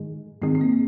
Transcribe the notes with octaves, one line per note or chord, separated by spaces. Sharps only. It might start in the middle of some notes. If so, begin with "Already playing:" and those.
Already playing: G#2 D#3 G#3
G#2 D#3 G#3 C4
C4
A#3